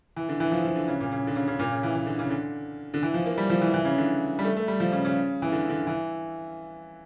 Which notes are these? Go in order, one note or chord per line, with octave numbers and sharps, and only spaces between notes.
E3
D3
E3
F3
F3
D3
C#3
A#2
C#3
D3
C#3
C#3
A#2
C#3
E3
E3
D3
C#3
D3
D3
E3
F3
A#3
G3
F3
E3
E3
C#3
D3
G3
A3
A3
G3
F3
C#3
C#3
E3
D3
D3
E3